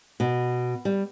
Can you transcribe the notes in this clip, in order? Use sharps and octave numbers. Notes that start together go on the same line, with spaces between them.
B2
G3